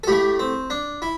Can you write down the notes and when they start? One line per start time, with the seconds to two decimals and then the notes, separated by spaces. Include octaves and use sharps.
0.04 A4
0.07 A2 A3 G4
0.39 C4
0.70 D4
1.02 E4